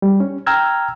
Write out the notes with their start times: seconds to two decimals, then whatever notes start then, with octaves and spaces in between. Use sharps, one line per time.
0.02 G3
0.20 C#4
0.46 G5 A#5 E6 F6 G#6